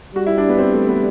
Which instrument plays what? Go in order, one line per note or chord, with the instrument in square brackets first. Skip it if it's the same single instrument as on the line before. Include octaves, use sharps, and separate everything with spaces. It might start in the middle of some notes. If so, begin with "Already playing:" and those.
[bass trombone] G3 [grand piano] F#4
[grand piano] E4
D4
B3
C4
A3
B3